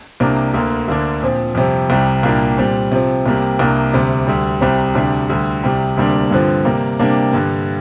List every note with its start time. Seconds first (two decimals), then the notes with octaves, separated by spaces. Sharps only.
0.20 C2 C3 A#3 D4
0.54 D2 D3 A#3
0.88 D2 D3 A#3 D4
1.21 A#2 F3 C4
1.55 F2 C3 G3 C4
1.90 C2 C3 G3
2.23 C2 A#2 G3 A#3 D4
2.57 A#2 G3 C4
2.91 C3 F3 C4
3.26 C2 C3 G3 A#3
3.59 C2 C3 A#3 D4
3.93 D2 C3 G3
4.27 D2 D3 G3
4.61 C2 C3 G3 C4
4.95 D2 C3 G3 D4
5.29 D2 D3 G3
5.63 C2 C3 G3
5.97 D2 C3 G3 A#3 D4
6.30 G2 D3 F3 C4
6.65 C3 G3 A#3
6.99 C3 G3 A#3 D4
7.33 G2 D3 G3